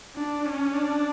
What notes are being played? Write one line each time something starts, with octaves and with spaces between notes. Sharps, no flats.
D4
C#4
D4